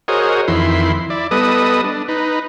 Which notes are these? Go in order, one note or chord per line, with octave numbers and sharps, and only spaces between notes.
F#4 G#4 A#4 C5 C#5 D#5
F2 D#3 E3 E4 B5 C6
E4 D5
G3 B3 A4 B4 D#5 D#6
D4
D#4 B4